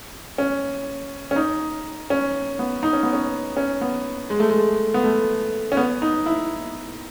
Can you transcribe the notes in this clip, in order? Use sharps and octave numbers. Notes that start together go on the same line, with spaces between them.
C#4
C#4
D#4
C#4
B3
D#4
C#4
B3
C#4
C#4
B3
G#3
A3
G#3
B3
A3
C#4
B3
D#4
E4